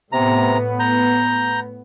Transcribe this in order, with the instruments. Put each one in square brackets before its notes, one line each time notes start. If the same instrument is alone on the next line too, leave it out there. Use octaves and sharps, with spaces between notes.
[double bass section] A2 B3 [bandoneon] C3 A#5
[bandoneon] A#5 G6